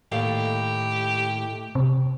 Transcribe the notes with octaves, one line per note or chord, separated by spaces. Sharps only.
D#2 A2 G4 F5
C3